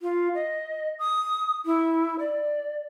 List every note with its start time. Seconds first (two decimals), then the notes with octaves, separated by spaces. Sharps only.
0.01 F4
0.35 D#5
0.99 D#6
1.66 E4
2.19 D5